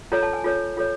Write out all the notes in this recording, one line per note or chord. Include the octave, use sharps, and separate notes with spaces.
F4 A4 C#5 A#5
A5
G#5
F4 A4 C#5
F4 A4 C#5